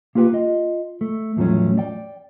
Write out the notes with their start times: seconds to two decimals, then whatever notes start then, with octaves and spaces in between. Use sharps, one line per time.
0.15 A#3 F4 G4 B4 G5
0.33 F4 D#5
1.01 A3
1.36 E2 A2 F3 F#3 A3 C#4
1.78 D5 G5